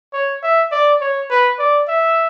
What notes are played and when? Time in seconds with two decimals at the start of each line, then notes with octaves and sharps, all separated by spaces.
0.14 C#5
0.43 E5
0.71 D5
1.01 C#5
1.30 B4
1.59 D5
1.88 E5